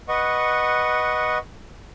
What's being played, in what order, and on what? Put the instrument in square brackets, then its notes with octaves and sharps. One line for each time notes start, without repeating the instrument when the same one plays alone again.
[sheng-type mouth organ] B4 D#5 F#5 C#6